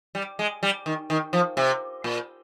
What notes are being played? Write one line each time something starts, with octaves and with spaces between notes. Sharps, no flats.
G3
G#3
G3
D#3
D#3
F3
C3
A#2